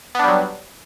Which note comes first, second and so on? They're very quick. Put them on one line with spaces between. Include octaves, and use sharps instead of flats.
B3 D4 G3 F#3